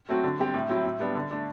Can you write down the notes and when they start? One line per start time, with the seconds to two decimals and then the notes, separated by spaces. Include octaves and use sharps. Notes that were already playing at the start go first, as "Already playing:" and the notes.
0.09 F#3 A3 C4 F#4
0.24 D3
0.39 G3 C4 G4
0.54 A2
0.69 F#3 C4 E4
0.85 A2
1.00 G3 B3 D4
1.15 D3
1.31 A3 D4